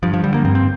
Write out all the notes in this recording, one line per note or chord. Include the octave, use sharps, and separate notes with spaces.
G2 F3
F3
D3 G3
A#3
G2 C4
C4